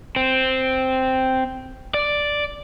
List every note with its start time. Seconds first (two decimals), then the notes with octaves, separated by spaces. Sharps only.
0.16 C4
1.94 D5